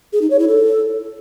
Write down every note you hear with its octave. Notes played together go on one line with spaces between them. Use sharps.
G#4
D#4
C#5
E4
A4